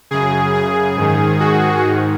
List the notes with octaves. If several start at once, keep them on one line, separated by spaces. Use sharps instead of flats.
F#2 C#3 G#4
G#4
G#2 D#3
F#4
G#2 D#3